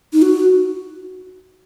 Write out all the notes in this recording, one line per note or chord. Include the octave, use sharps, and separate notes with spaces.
D#4
F#4